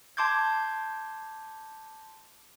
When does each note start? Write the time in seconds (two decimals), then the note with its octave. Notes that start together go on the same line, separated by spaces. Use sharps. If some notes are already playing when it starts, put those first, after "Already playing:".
0.17 A5 C6 D6 G6 G#6